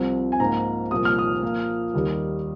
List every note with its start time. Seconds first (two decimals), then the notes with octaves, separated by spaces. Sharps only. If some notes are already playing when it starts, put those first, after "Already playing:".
Already playing: C2 C3 F3 C4
0.32 G#5
0.40 G#2 F3 A#3 A#5
0.91 C2 A#2 F3 A#3 D#6
1.05 F6
1.19 D#6
1.42 A#2 F3 A#3
1.94 D#2 D#3 G3